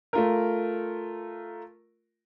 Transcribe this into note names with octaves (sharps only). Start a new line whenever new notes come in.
A3 F4 A#4